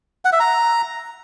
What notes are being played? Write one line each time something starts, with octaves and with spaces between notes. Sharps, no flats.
F#5
E5
A#5